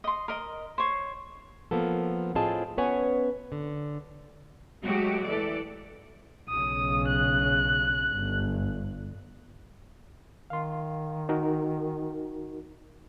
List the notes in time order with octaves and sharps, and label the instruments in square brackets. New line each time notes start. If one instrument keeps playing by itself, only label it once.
[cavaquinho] D#5 C6
A#4 D#5
C5 C#5
[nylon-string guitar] F3 A#3 B3 A4
A2 C4 F4 G#4 D#5 A5
B3 C#4 B4 C#5 F#5 G#5
D3
[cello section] F#3 G#3 A3 F#4 G4
E3 A4 D5
[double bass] B1 C#3 [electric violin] D#6
[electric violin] F#6
[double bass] G1
[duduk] D#3 [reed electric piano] F5 C6
[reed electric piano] D#4 F#4 A#4